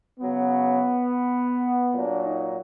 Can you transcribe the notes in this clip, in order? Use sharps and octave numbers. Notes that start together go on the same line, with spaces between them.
C#3 F#3 B3
A#2 F#3 D4
D#4